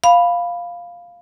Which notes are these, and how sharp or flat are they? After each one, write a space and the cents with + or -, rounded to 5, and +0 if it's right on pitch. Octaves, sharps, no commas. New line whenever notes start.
F5 +0 B5 +0